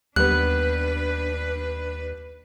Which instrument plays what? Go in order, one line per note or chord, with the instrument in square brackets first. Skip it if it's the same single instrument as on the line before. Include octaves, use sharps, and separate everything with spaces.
[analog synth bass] D#2 [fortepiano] G3 B3 [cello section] D4 B4 [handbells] F#6